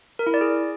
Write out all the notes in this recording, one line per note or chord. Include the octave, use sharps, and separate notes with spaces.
A#4
E4
D5
G#4